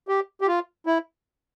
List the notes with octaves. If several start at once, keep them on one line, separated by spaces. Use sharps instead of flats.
G4
G4
F4
E4